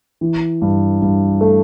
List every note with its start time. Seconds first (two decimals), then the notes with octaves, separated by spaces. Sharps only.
0.21 E3
0.62 G2
1.02 G2
1.41 A3